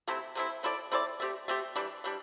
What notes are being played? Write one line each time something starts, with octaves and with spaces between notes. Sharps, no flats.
C3 A3 C4 E4
C3 A3 C4 E4
C4 E4 A4 D5
C4 E4 A4 D5
A3 C4 G4
A3 C4 G4
E3 G3 D4
E3 G3 D4